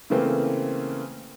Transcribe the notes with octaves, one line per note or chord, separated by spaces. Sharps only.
C#3 E3 A3 A#3 C4